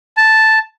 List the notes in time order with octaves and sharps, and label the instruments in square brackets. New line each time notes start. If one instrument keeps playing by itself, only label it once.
[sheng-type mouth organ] A5